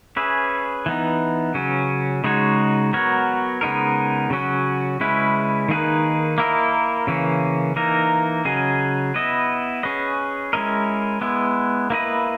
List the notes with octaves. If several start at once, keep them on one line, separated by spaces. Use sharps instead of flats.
C#4 G#4 B4 E5
E3 B3 D#4
C#3 F#3 C#4
C#3 G#3 D#4 F#4 C#5
F#3 B3 F#4 A#4 C#5
C#3 G#3 B3 D#4 A#4
C#3 F#3 C#4 F#4
C#3 G#3 C#4 E4 B4
D#3 A#3 D#4 G#4 B4
A#3 E4 A#4 D#5
C#3 E3 A#3 C#4
E3 A#3 D#4 A#4
C#3 F#3 C#4 G#4 D#5
B3 E4 B4 D#5
C#4 G#4 B4 D#5
G#3 C#4 E4 A#4 D#5
G#3 B3 E4
A#3 E4 B4 D#5